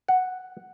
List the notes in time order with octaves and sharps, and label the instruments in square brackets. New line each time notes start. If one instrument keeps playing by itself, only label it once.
[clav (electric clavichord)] F#5